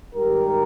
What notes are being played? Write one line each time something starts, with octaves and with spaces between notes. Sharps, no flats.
G#2 D#3 G3 G4 A#4